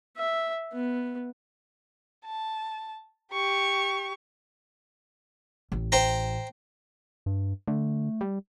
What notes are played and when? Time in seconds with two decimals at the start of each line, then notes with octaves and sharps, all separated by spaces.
0.17 E5
0.73 B3
2.25 A5
3.33 G4 C#6
5.72 A1
5.92 C5 G5 A#5
7.26 G2
7.68 D3 A3
8.21 G3